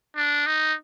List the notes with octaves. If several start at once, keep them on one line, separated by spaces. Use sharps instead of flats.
D4
D#4